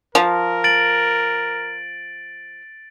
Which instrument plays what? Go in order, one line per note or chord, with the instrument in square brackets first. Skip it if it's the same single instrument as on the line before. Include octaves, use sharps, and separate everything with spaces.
[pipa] F3 [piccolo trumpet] A#4
[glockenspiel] A6 D7 F#7